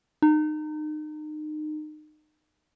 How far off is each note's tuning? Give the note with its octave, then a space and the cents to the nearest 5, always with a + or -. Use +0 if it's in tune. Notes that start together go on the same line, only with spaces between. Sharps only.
D#4 -30